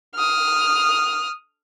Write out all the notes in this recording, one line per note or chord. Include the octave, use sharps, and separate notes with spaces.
D#6 F6